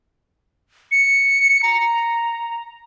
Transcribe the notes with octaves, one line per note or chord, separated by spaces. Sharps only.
C#7
A#5